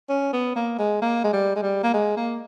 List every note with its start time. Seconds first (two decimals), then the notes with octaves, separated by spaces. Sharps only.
0.09 C#4
0.33 B3
0.56 A#3
0.79 G#3
1.02 A#3
1.24 G#3
1.33 G3
1.55 G#3
1.63 G3
1.83 A#3
1.94 G#3
2.17 A#3